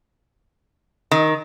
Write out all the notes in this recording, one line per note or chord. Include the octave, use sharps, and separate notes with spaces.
D#3